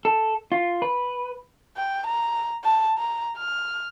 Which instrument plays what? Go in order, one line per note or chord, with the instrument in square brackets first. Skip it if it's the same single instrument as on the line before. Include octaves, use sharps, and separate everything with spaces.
[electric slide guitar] A4
F4
B4
[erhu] G5
A#5
A5
A#5
F6